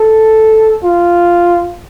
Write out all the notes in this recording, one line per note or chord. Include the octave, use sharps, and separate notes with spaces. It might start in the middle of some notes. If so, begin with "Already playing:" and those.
Already playing: A4
F4